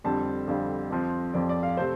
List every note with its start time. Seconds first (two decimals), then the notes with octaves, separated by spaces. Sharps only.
0.04 F2 D3 G3 C4 A5
0.48 F2 D3 G3 C4 F5
0.91 F2 F3 C4
1.34 F2 F3 C4 D5
1.49 D5
1.63 F5
1.77 C3 A3 C4 C5